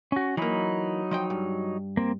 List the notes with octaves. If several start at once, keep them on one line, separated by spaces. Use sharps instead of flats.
C#4 F#4
E3 F#3 A#3 D#4 B5
F3 D#5 G5
G2
A#3 C4